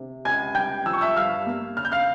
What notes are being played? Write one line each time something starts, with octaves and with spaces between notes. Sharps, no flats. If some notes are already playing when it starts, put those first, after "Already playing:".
Already playing: C3
C#2 G#5 G#6
G3 G5 G6
F3 E6
C#6
E5 E6
G2 F5 F6
A#3
C#3 F6
G6
F5 F6